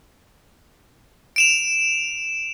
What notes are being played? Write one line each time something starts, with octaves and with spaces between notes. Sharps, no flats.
D7 E7 F7